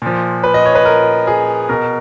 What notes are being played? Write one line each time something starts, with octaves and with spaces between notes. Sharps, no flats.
A#2 F3
B4
D#5
C#5
B4
A#4
G#4
B2 A#4